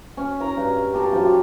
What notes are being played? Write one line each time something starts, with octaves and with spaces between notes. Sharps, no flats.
C#4
C#4 A#4 A#5
G2
G4 A4 A#4 C6
F#2 F4 C5 C#5
G4